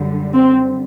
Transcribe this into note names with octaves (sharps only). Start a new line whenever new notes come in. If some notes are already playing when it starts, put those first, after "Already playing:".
Already playing: F#2 D3 G3
C4